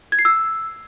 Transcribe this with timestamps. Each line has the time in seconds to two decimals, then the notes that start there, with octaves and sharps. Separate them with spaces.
0.12 G#6
0.19 C7
0.25 E6